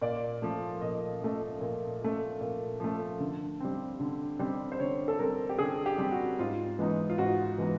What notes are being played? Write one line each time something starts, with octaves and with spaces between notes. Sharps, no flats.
A#2 D5
F3 A3
A#2 D#5
F3 A3
A#2
F3 A3
A#2
F3 A3
D3
G3 C4
D3
G3 C4
C5
D3 C#5
A4
G3 C4 A#4
G4
D3 G#4
G4
G3 C4
F#4
G#2 F4
E3 G#3 B3 D#4
F4
G#2 F#4
E3 G#3 B3 D#4